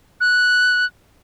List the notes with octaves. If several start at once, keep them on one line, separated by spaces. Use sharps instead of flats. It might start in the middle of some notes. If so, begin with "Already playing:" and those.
F#6